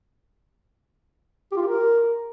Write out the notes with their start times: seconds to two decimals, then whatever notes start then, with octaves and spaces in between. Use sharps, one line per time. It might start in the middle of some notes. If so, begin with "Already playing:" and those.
1.52 G4
1.57 F4
1.62 G4
1.67 A#4